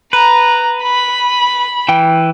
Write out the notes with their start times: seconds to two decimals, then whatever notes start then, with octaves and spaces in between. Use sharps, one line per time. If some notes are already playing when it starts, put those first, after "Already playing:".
0.13 B4 A#5
0.83 B5
1.88 E3 G5